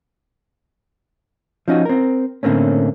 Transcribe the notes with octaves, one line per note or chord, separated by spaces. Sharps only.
F3 C#4 D#4 F#4
C4 A#4
A2 D3 A#3 C4 C#4